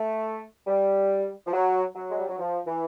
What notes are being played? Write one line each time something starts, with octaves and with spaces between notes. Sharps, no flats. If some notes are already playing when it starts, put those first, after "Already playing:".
Already playing: A3
G3
F3
F#3
F#3
G#3
G3
F#3
F3
E3